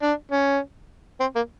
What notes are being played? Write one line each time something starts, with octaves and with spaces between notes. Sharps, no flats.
D4
C#4
C4
A#3